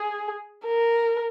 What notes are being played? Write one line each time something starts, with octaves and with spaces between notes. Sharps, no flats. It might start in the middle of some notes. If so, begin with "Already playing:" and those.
Already playing: G#4
A#4